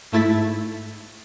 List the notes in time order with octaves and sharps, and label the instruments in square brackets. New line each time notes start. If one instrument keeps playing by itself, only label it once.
[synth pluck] G#2 A3 E4 A6 B6